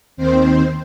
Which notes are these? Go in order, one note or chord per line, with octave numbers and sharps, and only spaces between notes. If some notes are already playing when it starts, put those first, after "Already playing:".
D#2 D#3 C4 C5